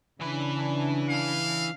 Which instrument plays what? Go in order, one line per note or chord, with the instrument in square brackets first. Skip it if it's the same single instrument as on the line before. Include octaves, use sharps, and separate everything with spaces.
[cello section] C#3 D4 [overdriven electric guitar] E3 B4
[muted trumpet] F5